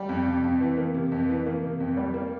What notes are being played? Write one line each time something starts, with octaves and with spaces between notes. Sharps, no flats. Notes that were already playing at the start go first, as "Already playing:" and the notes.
Already playing: G3
F2
C3
F2
E3
A#3
C3
F2
E3
A#3
C3
F2
G3
A#3